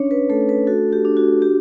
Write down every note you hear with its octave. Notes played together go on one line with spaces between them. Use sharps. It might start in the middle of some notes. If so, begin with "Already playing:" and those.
Already playing: C#4 D4 C#5
B4
A3 A4
B4
F#4 A4
G4
D4
F#4
F#4 G4